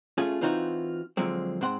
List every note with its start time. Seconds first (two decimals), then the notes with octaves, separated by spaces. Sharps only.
0.18 A3 C#4 F4 G#4
0.41 E3 C4 D#4 F4 F#4
1.17 D3 F3 F#3 G#3 C4
1.61 G#2 C4 F#5 C6